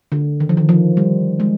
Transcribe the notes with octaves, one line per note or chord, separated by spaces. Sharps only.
D3
D#3
F3
D#3
F3
G3
G#3